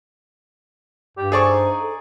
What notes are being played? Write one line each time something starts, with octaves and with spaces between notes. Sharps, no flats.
G2 G4
G#4 A4 C5 D5 C#6
D#4
A4